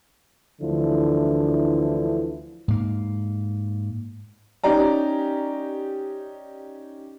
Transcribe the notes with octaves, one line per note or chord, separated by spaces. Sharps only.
D2 D3 E3 F3 E4
G#2 A#3
C#4 D#4 G4 D5 A#5